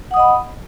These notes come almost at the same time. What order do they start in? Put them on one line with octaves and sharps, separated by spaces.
F#5 D#6 D#5 B5